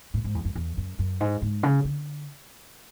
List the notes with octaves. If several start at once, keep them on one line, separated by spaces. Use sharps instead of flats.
A2
G#2
E2
F#2
E2
F#2
F#2
G#2
G#2
C#3
D3